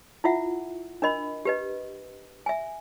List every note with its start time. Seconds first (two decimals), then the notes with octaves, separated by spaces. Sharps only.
0.24 E4 F4 E5 F#5
1.02 D4 A#4 D#5 B5
1.45 G4 B4 D#5
2.46 E5 G#5